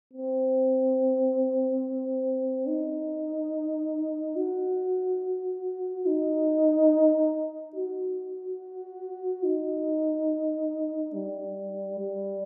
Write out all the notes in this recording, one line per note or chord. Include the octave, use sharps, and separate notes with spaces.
C4
D#4
F#4
D#4
F#4
D#4
G3
G3